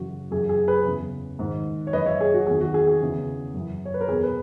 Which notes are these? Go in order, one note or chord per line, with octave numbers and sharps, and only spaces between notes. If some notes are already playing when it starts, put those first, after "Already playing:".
Already playing: F#2 C#3 E3 F#4
F#2 E3 G#4
G#4
G#4 B4
E2 C#3 E3
G#2 D#3
C#5
F#2 E3 B4 D#5
C#5 E5
G#4
F#4
E2 D#3 G#4
F#4
G#4
G#4
E2 C#3 E3
F#2 E3
C#5
B4
A#4
E2 B2 G#4
B4